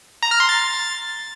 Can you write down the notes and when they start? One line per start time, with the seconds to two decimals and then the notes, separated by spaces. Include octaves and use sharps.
0.23 A#5
0.31 F6
0.40 C6
0.49 A6